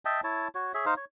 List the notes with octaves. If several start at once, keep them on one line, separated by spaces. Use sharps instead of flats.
D#5 E5 G5 A5
E4 C#5 A5
F#4 C#5
G#4 C#5 E5
D#4 C5 F5
C#5